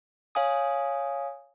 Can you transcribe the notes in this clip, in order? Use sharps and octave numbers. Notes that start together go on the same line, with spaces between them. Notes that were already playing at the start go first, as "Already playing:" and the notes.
C#5 F5 G#5 D#6